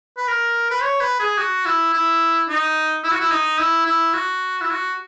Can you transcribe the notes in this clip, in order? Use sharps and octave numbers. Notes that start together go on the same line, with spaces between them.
B4
A#4
B4
C#5
B4
G#4
F#4
E4
E4
D#4
E4
F#4
E4
D#4
E4
E4
F#4
E4
F#4